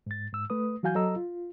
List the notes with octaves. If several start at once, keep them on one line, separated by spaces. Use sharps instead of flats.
G#2 A6
G#2 E6
A3 B4 D#6
E3 F#3 F#4 F5 G#5 G6
F#3 A4 D#5 A#5 E6
F4